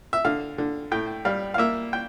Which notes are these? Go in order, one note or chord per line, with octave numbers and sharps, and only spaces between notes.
E5
D3 F5
D3
A2 G5
G3 F5
F5
A#3 E5
G5